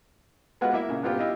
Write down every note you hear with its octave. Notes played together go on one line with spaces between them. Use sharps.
G#3 B3 F4 F#4 B4 F#5
A#3 E4 E5
A#2 C#3
G2 A#2 B3 C4 F4 G4
E4 F4 G4 D#5